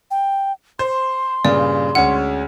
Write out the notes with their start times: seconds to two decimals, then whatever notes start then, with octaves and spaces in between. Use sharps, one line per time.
0.11 G5
0.79 C5 C6
1.45 G2 A#2 C#3 D5
1.95 D2 G#3 C#4 F#5